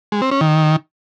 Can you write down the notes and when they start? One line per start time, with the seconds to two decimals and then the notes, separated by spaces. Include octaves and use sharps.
0.12 G#3
0.22 C4
0.31 C#4
0.41 D#3